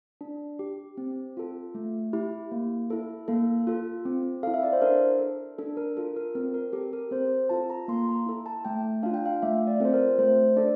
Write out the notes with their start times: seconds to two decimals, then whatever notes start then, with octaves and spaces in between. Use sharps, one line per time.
0.21 D4
0.59 G4
0.97 C4
1.37 F4 A4
1.75 A3
2.13 E4 G4
2.52 A#3
2.90 E4 A4
3.28 A#3 A4
3.67 F4 A4
4.05 C4
4.43 E4 A4 F5
4.54 E5
4.63 D5
4.73 C5
4.82 D4 A#4
5.19 A4
5.59 D4 A4
5.77 A#4
5.97 F4 A4
6.16 A#4
6.35 C4 A#4
6.54 A#4
6.73 G4 A4
6.93 A#4
7.11 C4 C5
7.49 F4 A4 A5
7.70 A#5
7.88 A#3 C6
8.08 A#5
8.26 E4 A4
8.46 A5
8.65 A3 G5
9.03 D4 F4 F5
9.14 G5
9.26 F5
9.42 A3 E5
9.67 D5
9.80 C4 F4 A4 C5
9.93 A#4
10.19 A3 C5
10.56 D4 A4 D5